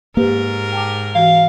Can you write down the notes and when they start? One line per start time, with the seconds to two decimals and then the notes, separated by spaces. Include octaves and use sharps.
0.17 G#2 A#3 G4 A#4 B4
0.72 G5 A5 D6
1.15 E3 F#4 F5